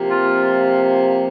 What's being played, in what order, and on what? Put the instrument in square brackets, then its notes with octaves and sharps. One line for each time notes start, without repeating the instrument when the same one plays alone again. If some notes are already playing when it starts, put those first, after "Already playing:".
Already playing: [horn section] C3 F3 A#3
F4